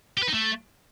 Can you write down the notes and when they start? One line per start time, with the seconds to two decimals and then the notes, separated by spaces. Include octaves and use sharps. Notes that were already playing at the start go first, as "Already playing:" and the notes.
0.18 G4
0.23 B4
0.28 D#4
0.33 A3